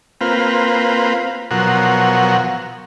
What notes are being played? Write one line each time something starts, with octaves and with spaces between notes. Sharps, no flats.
A#3 C4 F4 B4
B2 F3 F#3 A#4 F#5